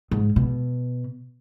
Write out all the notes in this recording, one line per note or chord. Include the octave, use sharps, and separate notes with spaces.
G#2
B2